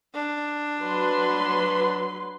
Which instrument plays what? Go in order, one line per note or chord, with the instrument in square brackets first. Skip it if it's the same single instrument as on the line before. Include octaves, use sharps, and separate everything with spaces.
[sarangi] D4
[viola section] F#3 B4 C6